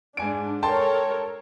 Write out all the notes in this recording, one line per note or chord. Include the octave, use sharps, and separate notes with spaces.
G#2 D4 G#5 D7
A4 A#4 C#5 G5 A5 C6